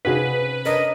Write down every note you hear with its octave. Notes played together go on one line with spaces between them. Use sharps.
C3 C#4 D#4 F#4 G#4 B4 F5
D4 A#4 C#5 D#5